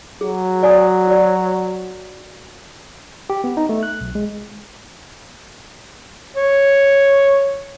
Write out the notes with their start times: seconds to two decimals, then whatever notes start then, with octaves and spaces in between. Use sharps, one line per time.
0.21 F#3 G#4
0.63 D5 G#5 D#6
1.08 F#4 D5
3.30 G4
3.44 B3
3.57 D#4
3.69 A3
3.83 F#6
4.01 B1
4.15 G#3
6.37 C#5